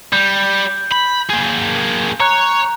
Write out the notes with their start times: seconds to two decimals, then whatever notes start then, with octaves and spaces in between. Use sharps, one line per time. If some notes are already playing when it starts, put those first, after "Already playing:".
0.13 G3 G6
0.92 B5
1.30 A#3 G#4
2.20 C#5 A#5 F#6